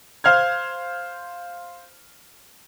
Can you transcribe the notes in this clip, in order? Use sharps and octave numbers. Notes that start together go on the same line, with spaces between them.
C5 F5 F6 G#6